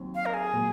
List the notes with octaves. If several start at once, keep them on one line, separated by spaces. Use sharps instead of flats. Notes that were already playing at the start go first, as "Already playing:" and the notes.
Already playing: D#2 D#3 F#3 C4
F5
A#4
G#4
A#2 F#3 A#3